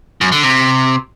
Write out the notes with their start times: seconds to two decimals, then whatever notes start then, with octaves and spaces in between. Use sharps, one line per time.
0.21 F#2
0.32 D3
0.43 C3